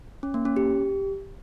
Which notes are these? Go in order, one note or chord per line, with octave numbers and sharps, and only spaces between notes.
C#4
A#3
C#4
G4